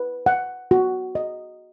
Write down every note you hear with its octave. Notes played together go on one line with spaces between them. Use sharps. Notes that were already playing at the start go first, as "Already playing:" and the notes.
Already playing: B4
F#5
F#4
D#5